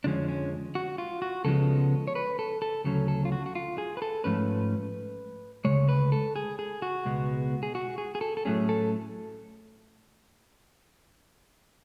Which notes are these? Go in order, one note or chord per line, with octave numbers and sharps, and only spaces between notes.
F2 D3 F3 G#3 C#4 D4
C#4
F#4
F4
F#4
C#2 C#3 F3 G#3 B3 A4
C#5
B4
A4
A4
D2 C#3 F#3 C#4 A4
A4
F4
F#4
F#4
F4
G#4
B4
A4
G#2 F3 A3 C#4 B4
D2 C#3 G#3 C#5
B4
A4
G#4
G#4
F#4
C#2 B2 G#3 B3
G#4
F#4
G#4
G#4
A4
A4
A2 F#3 A3 C#4 G#4
A4